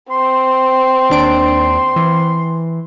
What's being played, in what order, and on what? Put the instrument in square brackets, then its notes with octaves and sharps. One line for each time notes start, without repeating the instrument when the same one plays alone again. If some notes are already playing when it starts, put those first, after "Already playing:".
[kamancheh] C4 [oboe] C6
[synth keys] D#2 D4 D7
E3